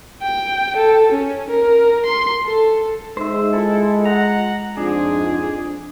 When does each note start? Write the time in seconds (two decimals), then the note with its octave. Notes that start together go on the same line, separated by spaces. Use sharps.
0.22 G5
0.76 A4
1.12 C#4
1.50 A#4
2.05 C6
2.45 A4
3.17 G#3 D#4 C5 E5
3.53 E4 F4 A4
4.05 F#5 A#5
4.77 F2 G#2 D4 F4 G#4